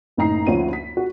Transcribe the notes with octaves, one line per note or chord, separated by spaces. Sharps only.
F#1 A2 D#4 A#5 C7
D2 F3 C#4 D#7
B6
F#4